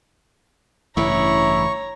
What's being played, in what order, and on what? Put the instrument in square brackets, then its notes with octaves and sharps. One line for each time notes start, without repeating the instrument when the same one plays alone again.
[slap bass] A1 G2 C#3 [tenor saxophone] E4 [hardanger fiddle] C#5 A#5 [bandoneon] C#6